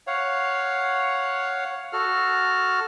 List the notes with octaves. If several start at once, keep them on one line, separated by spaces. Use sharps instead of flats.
C#5 F5 F#5
F#4 A4 F6